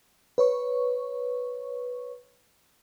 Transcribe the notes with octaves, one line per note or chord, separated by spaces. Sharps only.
B4 C#5 C#6